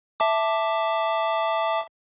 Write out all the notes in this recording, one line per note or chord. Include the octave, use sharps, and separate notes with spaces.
E5 A5 D6